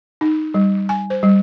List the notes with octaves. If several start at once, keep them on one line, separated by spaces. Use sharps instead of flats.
D#4
G3
G#5
C5
G3